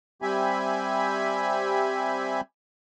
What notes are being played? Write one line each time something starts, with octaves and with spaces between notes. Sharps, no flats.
G3 C4 G4 E5 G#5 B5